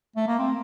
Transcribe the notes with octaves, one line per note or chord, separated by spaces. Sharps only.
A3
A#3
C4